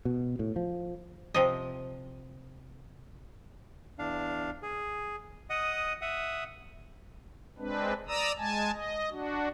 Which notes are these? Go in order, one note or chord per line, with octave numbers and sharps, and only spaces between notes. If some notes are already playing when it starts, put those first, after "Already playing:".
B2
A2
F3
C3 F3 D#5
E2 D4 F5
G#4
D#5 F#5 D#6
E5 F#5 D#6
G#3 C4 D4 B4
D5 A#5 D#6 E6
G#3 G#5 A5
D#5
D4 F#4